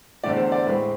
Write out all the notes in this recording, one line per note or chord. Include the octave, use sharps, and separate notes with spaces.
E2 D3 A3 C4 D5
C5
D5
A2 G#3 C4 B4